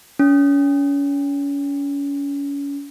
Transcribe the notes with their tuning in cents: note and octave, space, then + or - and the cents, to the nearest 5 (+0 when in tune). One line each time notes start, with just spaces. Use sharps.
C#4 +35